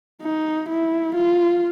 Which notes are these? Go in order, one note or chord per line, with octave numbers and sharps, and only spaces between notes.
D#4
E4
F4